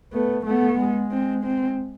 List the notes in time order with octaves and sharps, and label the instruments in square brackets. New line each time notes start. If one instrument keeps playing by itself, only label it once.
[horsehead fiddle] A3 [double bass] B3
[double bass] A3 [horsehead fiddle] B3
[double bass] G#3
[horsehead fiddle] C4
C4